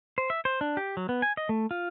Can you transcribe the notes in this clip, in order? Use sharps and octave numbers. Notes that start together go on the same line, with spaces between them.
C5
E5
C5
D4
G4
F#3
B3
G#5
D#5
A3
F4